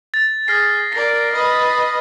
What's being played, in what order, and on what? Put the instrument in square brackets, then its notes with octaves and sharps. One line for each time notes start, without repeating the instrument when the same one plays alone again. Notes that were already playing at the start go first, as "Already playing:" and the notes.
[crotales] A6
[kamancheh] G#4 [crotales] F6 A#6 C7
[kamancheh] A#4 D5 [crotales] A#6 C7
[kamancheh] B4 D#5